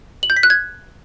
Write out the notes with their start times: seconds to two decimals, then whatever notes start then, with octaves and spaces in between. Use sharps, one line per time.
0.23 F#7
0.30 G6
0.37 B6
0.43 F#6
0.50 G#6